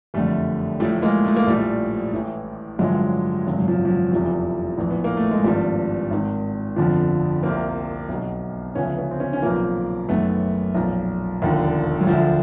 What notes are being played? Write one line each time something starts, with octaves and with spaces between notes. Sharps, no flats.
F#1 F2 D3 G3 A3
A1 A2 F3 G3 A3
A3
G#3 A#3
A3
A#3
A#1 A2 F3 G3 A3
A1 A2 E3
A1 G2 D3 F3 F#3 G#3
G#1 F#2 C#3
F#3
F3
F3
F#3
F1 E2 C3 E3 F3 G3
A#1 A2 E3
B3
A#3
A3
G#3
G#1 G2 E3 F3 G3
G#1 G#2 D#3
G1 F2 D3 F3
C2 C3 F3 A#3 C4
B1 B2
D2 C#3 F3 B3 C#4
B3 C#4
C4
B3 C#4
C#4
B1 A#2 F3 A#3 C4
F#1 F#2 D#3 A3 B3
B1 A#2 F3
E1 D#2 D3 F3
F#3
D2 D3 F3